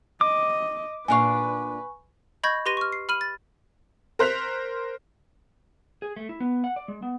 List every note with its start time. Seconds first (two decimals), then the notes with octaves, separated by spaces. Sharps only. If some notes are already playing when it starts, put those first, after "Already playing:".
0.21 D#5 D6
1.08 A#2 D4 B4 F5 G#5 C#6
2.43 D#5 B5 C#6 G6 G#6 A#6
2.66 G4 B4 C6 A#6 D#7
2.77 C#6 F6
2.92 C7
3.09 B5 F6 D#7 F#7
3.21 A6
4.19 A#4 C5 F#6 B6 F7
6.02 G#4
6.16 A3
6.29 E4
6.40 B3
6.64 F#5
6.76 D5
6.88 G#3
7.02 B3